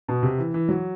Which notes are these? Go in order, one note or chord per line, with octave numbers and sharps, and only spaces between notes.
B2
C3
E3
E3
F#3